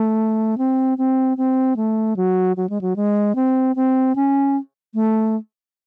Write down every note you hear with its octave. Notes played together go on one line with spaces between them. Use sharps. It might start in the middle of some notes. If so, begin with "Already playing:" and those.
Already playing: A3
C4
C4
C4
A3
F#3
F#3
G#3
F#3
G#3
C4
C4
C#4
A3